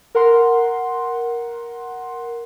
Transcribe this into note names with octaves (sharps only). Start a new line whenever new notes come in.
A#4 F#5 C6